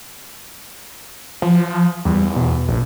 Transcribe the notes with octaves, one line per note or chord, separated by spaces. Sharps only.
F3
E2 G3
B2
A#1